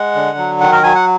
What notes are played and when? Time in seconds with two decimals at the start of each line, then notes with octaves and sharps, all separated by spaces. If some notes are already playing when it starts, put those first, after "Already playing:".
Already playing: G#3 F#5
0.15 D3
0.38 F#3
0.61 D#3 F#5
0.72 A#4
0.83 F#3 G#5
0.95 F#5